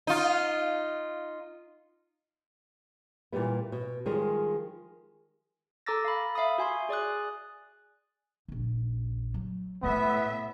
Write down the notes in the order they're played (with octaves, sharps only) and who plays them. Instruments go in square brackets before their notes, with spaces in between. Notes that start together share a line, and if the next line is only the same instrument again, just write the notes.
[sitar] D#4 F4
[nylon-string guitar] A#2 E3 G3 B3
B2
D#3 F3 G3 G#3 G#4
[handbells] A4 A#5 D6 E6 A6 A#6
F5 B5
E5 F5 B5 D#6
F#4 G#5 C6
G#4 D5 G#5 D#6 F#6
[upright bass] F1 A#1
F#3 A3
[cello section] A2 E5 [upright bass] C3 A3 [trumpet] B3